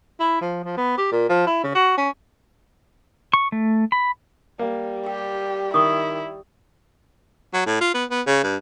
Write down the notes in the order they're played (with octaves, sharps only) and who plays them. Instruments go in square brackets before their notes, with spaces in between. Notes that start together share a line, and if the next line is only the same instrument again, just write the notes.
[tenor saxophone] E4
F3
F3
B3
G4
A#2
F3
E4
C#3
F#4
C#4
[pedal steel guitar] C#6
A3
B5
[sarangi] G3 [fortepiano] A#3
[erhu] G4 [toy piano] G5
[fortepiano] D#3 [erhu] E4 [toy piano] C#6 D#6
[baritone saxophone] F#3
A2
F4
B3
B3
C#3
G2